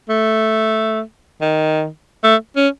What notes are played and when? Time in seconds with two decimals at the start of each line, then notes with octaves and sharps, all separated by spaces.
0.09 A3
1.41 D#3
2.24 A3
2.56 C#4